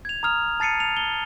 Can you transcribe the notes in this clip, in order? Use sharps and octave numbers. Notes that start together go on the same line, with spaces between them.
G#6 F7
A#5 D#6 F6 F7
A5 A6 C7 C#7 D#7
F7
G7